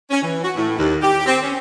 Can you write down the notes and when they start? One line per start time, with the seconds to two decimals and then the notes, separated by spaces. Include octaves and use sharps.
0.10 C#4
0.22 E3
0.43 F#4
0.56 A2
0.77 D#2
1.02 G4
1.26 C4
1.42 C#4